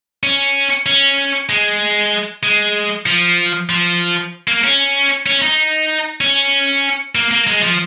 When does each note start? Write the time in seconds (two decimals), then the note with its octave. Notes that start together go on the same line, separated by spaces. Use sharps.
0.23 C#4
0.86 C#4
1.49 G#3
2.43 G#3
3.06 F3
3.70 F3
4.48 A#3
4.64 C#4
5.26 C#4
5.42 D#4
6.21 C#4
7.15 A#3
7.31 A#3
7.47 G#3
7.62 F3